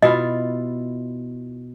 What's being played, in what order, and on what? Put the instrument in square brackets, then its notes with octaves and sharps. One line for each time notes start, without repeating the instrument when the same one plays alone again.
[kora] B2 E4 F4 [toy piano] D#5